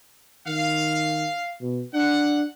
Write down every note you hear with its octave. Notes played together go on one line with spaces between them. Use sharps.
D#3 F5
B2
D4 F#5